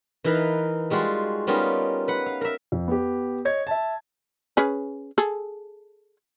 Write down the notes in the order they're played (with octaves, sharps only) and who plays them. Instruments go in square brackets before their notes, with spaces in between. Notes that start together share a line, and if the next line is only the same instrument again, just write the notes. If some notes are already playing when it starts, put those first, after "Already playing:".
[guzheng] E3 D#4 A#4 B4 F5
G3 G#3 F4 F#4
G3 B3 C#4 D#4 F4 A#4
B4 F#5
F5
A#4 E5
[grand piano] F2
B3 G4
C#5 D#5 G#6
E5 A5
[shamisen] C#4 G#4 B4
G#4 A4